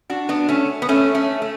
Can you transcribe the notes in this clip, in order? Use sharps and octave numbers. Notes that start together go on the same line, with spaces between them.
D4 F#4
B3 D4
A3 C#4
B3
A3 C#4
A3 C#4
A3